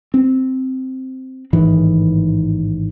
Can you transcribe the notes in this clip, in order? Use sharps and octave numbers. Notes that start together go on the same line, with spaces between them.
C4
A1 G#2 D#3 E3